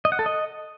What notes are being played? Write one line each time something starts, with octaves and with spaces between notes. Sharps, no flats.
D#5
F#5
A4
D#5